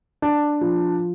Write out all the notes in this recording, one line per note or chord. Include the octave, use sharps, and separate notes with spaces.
D4
F3